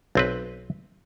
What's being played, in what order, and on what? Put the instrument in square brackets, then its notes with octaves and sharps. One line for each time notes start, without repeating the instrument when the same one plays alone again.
[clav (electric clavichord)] B1 C4 B4